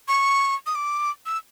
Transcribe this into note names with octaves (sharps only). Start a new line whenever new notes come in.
C#6
D#6
D6
E6